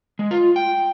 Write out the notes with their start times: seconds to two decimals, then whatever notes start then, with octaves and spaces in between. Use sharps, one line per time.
0.19 G#3
0.31 F4
0.56 G5